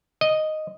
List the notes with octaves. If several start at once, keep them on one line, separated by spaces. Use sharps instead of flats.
D#5